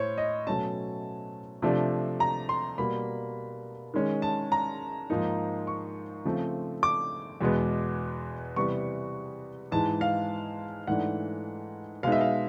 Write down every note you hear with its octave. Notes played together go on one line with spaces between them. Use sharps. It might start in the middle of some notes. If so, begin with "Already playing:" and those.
Already playing: A2 C5 C#5
D#5
B2 F#3 A3 C#4 A5
C3 F3 A3 D4
A#5
C6
B2 G3 A#3 B5
D#3 G#3 C#4
A5
A#5
G#2 F3 A#3 D#4
C#6
C#3 F3 A3 C4
D6
E2 B2 G#3 B3
C3 E3 G3 B3 C#6
G#2 E3 G#3 A5
F5
G#2 E3 A3 D4 F#5
B2 G#3 B3 D#4 F5
E5
F5